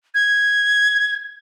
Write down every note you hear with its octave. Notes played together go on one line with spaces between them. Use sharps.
G#6